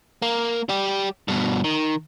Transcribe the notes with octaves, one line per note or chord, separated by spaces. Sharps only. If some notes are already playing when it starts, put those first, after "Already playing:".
A#3
G3 G4
G2 B2
D#3